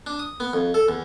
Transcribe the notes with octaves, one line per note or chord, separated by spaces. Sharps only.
D4
D#6
B3
F2
A4
E2